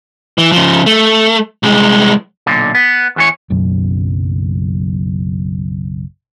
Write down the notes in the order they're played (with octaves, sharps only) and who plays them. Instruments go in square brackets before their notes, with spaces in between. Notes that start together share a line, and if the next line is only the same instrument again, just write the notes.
[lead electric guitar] E3
C#3 F3
A3
C2 G#3
[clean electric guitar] B1 A#2 D3
B3
E2 E3 C#5
[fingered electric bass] F#1 B1 F#2